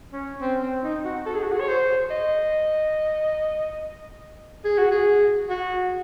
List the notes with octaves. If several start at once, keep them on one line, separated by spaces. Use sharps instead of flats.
C#4
C4
C4
D#4
F#4
A4
G#4
F#4
G#4
C#5
C5
D#5
G#4
F#4
G#4
F#4